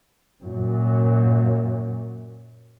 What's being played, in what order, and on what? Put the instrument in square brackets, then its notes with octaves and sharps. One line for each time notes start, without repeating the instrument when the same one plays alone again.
[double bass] F#2 A#2